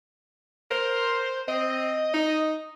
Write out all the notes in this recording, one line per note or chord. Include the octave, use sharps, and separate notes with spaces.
A#4 C5
C4 D#5
D#4